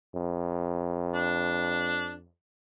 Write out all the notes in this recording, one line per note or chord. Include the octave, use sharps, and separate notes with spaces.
F2
D4